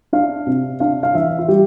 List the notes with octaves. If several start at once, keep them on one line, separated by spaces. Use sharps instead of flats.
D4 F5
C3
D4 F5
F5
E3 E5
F4
G3 G4